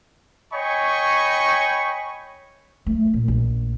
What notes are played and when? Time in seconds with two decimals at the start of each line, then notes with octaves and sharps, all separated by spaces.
0.52 C#5 D#5 G5 G#5 B5 C#6
2.86 A3
3.14 A#2
3.28 A#1